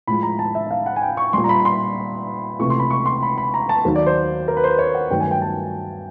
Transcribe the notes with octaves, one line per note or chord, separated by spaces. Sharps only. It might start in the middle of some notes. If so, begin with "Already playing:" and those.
A2 F3 G#3 B5
A#5
A5
E5
E5
F5
F#5
G#5
G5
C#6
A#2 G3 C6
A#5
B5
C6
C#2 C3 E3 A3 C#6
C6
B5
C#6
C6
B5
B5
A#5
A5
D#2 D#3 F#3
D5
C5
A#4
B4
C5
C#5
F#5
G2 D#3 F#3 A3 G5
G#5
G5
A5